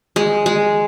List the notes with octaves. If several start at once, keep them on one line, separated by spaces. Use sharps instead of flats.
G#3
G#3